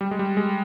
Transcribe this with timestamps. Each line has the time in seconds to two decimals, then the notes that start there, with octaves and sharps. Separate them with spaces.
0.01 G3
0.11 G#3
0.19 G3
0.37 G#3